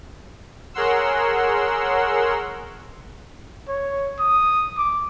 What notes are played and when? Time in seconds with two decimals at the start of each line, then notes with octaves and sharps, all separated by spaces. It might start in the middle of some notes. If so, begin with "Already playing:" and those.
0.74 G#4 A#4 C#5 F#5 C6 E6
3.68 C#5
4.19 D#6
4.78 D6